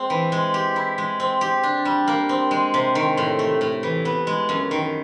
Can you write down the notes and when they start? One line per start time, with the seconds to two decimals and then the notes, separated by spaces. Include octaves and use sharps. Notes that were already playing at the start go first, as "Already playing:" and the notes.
Already playing: G#3 C4
0.10 E3
0.32 G#3
0.54 G4
0.76 E4
0.98 G#3
1.20 C4
1.41 G4
1.63 D4
1.85 G3
2.08 A#3
2.29 C4
2.51 G#3
2.74 C3
2.95 D#3
3.17 A2
3.39 A3
3.61 A2
3.83 E3
4.05 B3
4.27 G#3
4.49 F#2
4.71 D#3